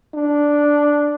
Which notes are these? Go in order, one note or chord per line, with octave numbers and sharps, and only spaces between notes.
D4